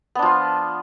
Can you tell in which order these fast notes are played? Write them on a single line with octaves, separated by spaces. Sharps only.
B3 D4 F3 F4